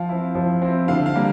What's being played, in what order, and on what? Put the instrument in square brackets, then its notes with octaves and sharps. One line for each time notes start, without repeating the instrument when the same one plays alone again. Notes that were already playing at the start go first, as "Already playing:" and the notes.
Already playing: [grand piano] F3 F5
C4 E4
F3
C4 E4
D3 F5
F5
G3 A#3